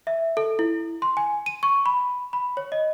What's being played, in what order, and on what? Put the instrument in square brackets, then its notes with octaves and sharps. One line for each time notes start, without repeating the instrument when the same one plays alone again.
[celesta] E5
A4
E4
C6
G#5
D#7
C#6
B5
B5
C#5
D#5